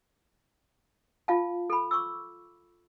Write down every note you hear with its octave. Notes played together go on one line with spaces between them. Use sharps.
F4 F5 A5
A4 B5
C#6 D6 E6